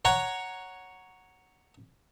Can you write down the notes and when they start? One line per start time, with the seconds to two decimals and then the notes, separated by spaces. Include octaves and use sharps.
0.05 C#5 F#5 A#5 C#6